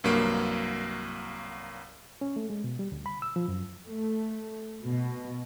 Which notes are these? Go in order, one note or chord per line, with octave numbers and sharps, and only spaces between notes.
C2 G2 F#3 A#3
C#4
A3
G#3
B2
G3
D2
B5
E6
F3
F#2
A3
B2